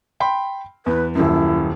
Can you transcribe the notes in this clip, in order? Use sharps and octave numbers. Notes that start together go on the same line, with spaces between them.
G5 B5 C6
E2 B4
D#1 F#2 E4